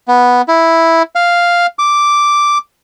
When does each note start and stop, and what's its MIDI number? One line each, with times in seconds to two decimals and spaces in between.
0.08 0.42 59
0.48 1.02 64
1.15 1.66 77
1.79 2.58 86